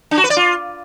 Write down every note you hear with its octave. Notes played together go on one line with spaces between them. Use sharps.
D4
F#4
B4
D5
F4